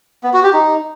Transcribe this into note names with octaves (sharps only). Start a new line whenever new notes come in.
B3
F#4
G4
D#4